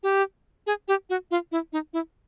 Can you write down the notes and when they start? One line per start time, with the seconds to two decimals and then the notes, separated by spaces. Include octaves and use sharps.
0.03 G4
0.67 G#4
0.88 G4
1.10 F#4
1.31 F4
1.52 E4
1.73 D#4
1.93 E4